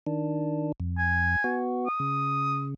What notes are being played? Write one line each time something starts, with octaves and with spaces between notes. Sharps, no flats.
D#3 D4
F2
G#5
B3 F#4
D#6
C#3